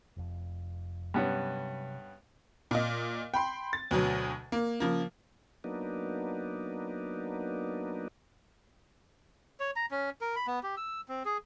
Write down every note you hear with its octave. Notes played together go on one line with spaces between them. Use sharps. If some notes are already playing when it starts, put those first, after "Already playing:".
F1 F2
G2 C3 F#3 B3 C#4
A#2 D#5
G5 B5 C6
A6
D2 B2 F#3
A#3
C#3 F3 A#3
F#3 A#3 B3 D4 D#4
C#5
A#5
C#4
A#4
B5
B3
G4
E6
C4
G#4